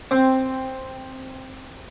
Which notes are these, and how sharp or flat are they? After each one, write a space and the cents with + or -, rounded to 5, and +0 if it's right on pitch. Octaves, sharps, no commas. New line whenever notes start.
C4 +5